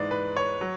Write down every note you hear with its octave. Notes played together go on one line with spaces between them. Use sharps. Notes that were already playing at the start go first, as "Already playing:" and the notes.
Already playing: G#2 E3 G#3 D5
B4
C#5
F#3